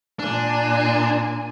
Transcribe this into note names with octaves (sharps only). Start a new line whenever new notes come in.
A#2 D4 G#5